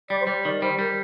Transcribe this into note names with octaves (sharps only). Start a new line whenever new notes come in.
G3 D5
C5
G3 D5
D#3 D5
G3 C5
G3 A#4